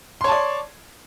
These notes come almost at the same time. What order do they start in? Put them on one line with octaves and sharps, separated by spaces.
C6 C#5 A5 D5